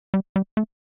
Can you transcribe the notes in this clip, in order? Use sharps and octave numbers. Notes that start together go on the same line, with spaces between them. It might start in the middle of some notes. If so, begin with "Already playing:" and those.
G3
G3
A3